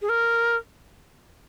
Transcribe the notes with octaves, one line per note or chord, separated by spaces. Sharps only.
G#4
A#4